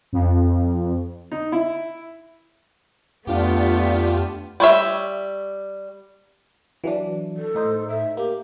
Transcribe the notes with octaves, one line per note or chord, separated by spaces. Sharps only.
F2
D#4
E4
F2 A3 B3 D4 F4 G4
G3 C#5 E5
E3 F#3 D4
A4
A2 D#4 C5
E5
A#3 G4